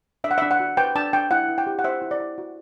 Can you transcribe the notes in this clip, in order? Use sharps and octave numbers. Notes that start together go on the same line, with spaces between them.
D4 E5
F#5
E5
D4
F#5
F#4
B4 G5
D4 A5
D4 G5
E4 F#5
E4
G5
G4
F#5
C5 E5
E4
D5
E4
F#4